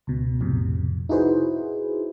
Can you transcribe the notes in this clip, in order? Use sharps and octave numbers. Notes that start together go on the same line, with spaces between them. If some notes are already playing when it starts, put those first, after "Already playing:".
C#2 B2
B1 F2 A2 C3
D#4 E4 F#4 G#4 B4 C5